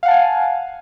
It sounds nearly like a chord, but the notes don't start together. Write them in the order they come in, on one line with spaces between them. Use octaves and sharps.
F5 F#5 A5 G#5